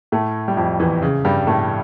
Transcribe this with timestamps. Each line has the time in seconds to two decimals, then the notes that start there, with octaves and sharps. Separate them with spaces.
0.12 A2 A3
0.48 G3
0.57 F2 F3
0.80 E2 E3
1.02 C#3
1.25 G2 G3
1.47 A2 A3